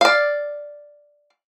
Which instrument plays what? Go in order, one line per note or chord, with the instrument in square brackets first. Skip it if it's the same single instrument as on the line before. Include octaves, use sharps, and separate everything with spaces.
[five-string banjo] D5 F5